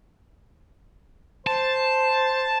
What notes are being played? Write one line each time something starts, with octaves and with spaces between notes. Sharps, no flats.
C5 A5